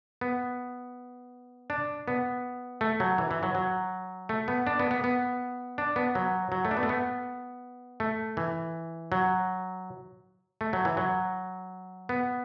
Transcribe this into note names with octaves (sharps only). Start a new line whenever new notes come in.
B3
D4
B3
A3
F#3
E3
E3
F#3
F#3
A3
B3
D4
B3
B3
B3
D4
B3
F#3
F#3
A3
D4
B3
A3
B3
A3
E3
F#3
A3
F#3
E3
F#3
B3